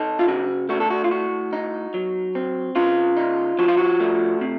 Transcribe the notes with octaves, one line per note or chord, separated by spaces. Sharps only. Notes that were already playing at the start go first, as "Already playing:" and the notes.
Already playing: D#4 A4
F4
C#3 F#4
A3 F#4
A4
F#4
F4
A2 F#4
D#4
F#3
C4
C#3 F4
D#4
F3 F#4
F4
F#4
A3
C3